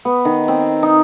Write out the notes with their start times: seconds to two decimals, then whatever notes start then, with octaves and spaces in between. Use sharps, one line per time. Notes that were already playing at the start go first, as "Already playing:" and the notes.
0.05 B3
0.25 D#3
0.48 C4
0.83 D#4